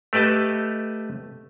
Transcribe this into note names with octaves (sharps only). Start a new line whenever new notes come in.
A3 G4 B4 D#5 A5